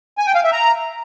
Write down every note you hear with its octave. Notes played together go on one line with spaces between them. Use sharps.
G#5
G5
F5
E5
A#5